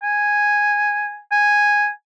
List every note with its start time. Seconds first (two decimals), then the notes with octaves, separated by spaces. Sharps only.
0.03 G#5
1.32 G#5